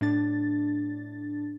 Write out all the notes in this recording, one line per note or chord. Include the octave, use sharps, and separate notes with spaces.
A2 D4 A6